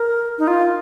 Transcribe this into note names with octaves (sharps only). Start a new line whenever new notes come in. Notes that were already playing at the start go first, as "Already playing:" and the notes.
Already playing: A#4
D#4
F4